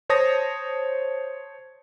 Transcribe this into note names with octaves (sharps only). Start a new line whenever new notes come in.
C5 C#5 A5 D#6 A#6